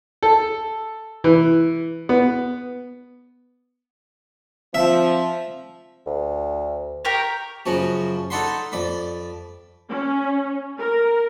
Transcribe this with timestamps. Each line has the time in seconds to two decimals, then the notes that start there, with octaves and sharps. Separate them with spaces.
0.23 A4
1.24 E3
2.09 B3
4.74 F3 C4 E5
6.07 D2
7.05 G4 A#4 C#5
7.66 F#2 C#3 F3 F#4
8.30 D#4 A4 D5 F#5 B5 C6
8.72 F2 D5 B5
9.90 C#4
10.78 A#4